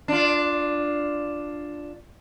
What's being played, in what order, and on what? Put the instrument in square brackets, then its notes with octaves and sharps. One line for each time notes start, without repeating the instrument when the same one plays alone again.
[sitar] D4 F4